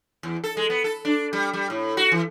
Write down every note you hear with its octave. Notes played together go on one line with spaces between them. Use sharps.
E2
A4
G#3
B3
A4
D4
G3
G3
A2
F#4
E3